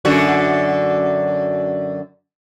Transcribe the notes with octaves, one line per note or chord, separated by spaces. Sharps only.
F#2 D3 F#4